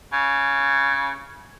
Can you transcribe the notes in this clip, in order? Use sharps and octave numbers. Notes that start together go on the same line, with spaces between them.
C#3